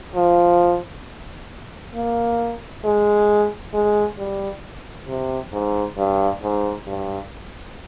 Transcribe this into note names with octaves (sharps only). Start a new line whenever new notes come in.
F3
A#3
G#3
G#3
G3
C3
G#2
G2
G#2
G2